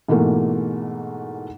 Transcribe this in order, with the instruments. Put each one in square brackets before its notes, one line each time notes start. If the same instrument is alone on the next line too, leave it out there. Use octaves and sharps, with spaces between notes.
[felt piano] G#2 B2 E3 A3 A#3